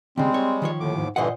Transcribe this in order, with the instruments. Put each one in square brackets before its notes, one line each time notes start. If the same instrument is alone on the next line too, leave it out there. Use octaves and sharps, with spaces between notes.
[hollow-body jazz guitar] D#2 C#3 [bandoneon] G3 G#3 [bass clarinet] C4
[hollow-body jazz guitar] C#5
D#3 F3 C#5
[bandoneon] D#2 A2 D6 [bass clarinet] D3
[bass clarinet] G#2
[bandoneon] G2 D3 E3 [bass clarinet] A#2 [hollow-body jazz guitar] C5 D#5 F#5